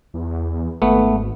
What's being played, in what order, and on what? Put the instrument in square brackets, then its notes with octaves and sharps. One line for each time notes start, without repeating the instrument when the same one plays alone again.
[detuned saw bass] E2
[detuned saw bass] G#1 [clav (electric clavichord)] A3 B3